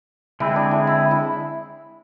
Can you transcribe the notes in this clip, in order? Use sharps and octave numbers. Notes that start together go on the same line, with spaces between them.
D3 G#3 C4 E4 G#4
D4
E4
E4
E4